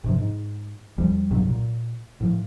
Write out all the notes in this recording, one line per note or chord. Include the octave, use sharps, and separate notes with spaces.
G2 C3 F3
G#2
E2 F3 G3
C2 G2 B2 F#3
A#2
A2 F3